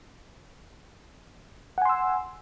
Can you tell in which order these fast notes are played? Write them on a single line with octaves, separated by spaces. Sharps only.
F#5 G#5 C6 E6